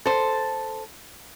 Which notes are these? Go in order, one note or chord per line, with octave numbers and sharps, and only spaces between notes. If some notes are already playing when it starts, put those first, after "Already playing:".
A4 C5